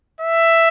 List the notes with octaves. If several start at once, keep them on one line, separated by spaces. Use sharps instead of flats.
E5